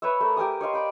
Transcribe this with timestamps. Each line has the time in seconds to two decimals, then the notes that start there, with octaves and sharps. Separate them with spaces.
0.02 B4 C#5 E5
0.21 A3 A#4 D5
0.37 G4 A#4 G#5 D#6
0.61 C#5 D#5 F5 C6
0.73 D5 G5 B5